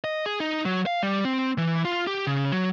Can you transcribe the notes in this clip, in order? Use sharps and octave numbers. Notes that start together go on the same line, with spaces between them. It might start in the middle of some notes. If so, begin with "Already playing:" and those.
D#5
G#4
D#4
F#3
F5
G3
C4
E3
F4
G4
C#3
F#3